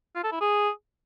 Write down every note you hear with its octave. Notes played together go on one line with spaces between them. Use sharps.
F4
A4
E4
G#4